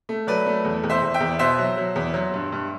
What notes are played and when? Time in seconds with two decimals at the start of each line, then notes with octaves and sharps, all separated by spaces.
0.09 A3
0.27 F#3 B4 D5
0.46 A3
0.65 E2
0.83 E2
0.90 C5 E5
1.02 E2
1.14 E5 G5
1.20 E2
1.39 B2 C5 E5
1.59 F#3
1.77 F#3
1.96 E2
2.14 F#3
2.34 G2
2.52 G2